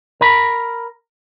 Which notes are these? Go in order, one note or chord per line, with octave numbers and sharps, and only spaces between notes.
A#4 B5